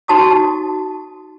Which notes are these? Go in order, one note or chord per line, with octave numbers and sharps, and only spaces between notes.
D#4 F#4 A5 C#6 D#6